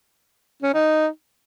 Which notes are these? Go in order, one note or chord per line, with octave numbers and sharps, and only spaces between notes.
C#4
D#4